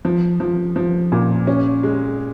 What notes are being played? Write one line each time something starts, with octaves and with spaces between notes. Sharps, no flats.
F3
F3
F3
A#2
C#4
G#3